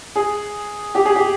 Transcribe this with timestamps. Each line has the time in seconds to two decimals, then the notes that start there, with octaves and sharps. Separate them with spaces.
0.16 G#4
0.95 G4
1.05 G#4
1.16 G4